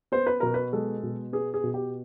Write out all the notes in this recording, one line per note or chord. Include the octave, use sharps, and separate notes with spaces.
B3 C5
B4
B2 A#4
B4
G#3 A4
B2
B3 G#4
G#4
B2
G4